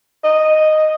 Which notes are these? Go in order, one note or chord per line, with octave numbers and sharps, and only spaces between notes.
D#5